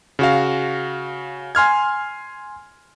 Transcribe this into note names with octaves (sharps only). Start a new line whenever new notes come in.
C#3 F#4 F5
G#5 C6 F6 G#6